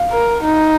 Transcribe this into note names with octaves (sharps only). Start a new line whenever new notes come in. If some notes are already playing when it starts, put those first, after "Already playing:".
Already playing: F5
A#4
D#4